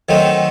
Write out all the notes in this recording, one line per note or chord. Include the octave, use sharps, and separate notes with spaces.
D#3 F#3 A3 C4 D#4